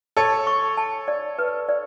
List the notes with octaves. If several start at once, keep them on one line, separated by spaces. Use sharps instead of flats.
A4 C#5 A5
C#6
A5
D5
B4
D5